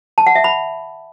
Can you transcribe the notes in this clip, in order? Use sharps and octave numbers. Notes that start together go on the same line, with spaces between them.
A5
F#5
E5
B5